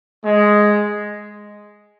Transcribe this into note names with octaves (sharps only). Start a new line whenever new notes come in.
G#3